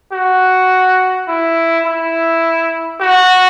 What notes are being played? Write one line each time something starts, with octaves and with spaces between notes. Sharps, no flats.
F#4
E4
E4
F#4